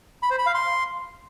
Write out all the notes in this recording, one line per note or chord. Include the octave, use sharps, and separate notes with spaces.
B5
C5
B5
F5
C6